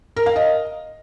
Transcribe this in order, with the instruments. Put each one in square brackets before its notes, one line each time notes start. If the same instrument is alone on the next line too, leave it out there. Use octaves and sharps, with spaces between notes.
[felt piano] A#4
F5
D#5